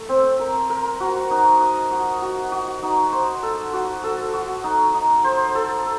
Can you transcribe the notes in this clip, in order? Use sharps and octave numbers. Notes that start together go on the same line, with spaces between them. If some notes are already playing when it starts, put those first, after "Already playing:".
Already playing: A3
C4
A#4
A#4
F#4
D#4
D#5
F#4
F#4
F#4
D#4
C5
A4
F#4
A4
F#4
D#4
D#4
C5
A4